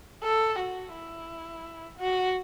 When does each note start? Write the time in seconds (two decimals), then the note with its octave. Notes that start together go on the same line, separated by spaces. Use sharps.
0.23 A4
0.59 F#4
0.93 E4
1.98 F#4